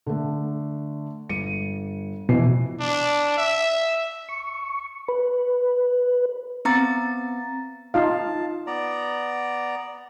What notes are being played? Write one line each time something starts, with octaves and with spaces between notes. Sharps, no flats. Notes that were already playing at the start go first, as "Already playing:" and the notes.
D3 A3
G1 C#7 D#7
F2 B2 E3 C7
D4
E5
C#6
B4
B3 C4 A#5 A6
D#4 F4 F5 A5
B3 D5 A#5